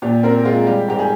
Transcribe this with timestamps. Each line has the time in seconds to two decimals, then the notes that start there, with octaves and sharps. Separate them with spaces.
0.02 A#2 G4
0.23 C4 A#4
0.45 G#3 F4
0.66 G3 G4
0.88 G#2 G4
0.99 G#4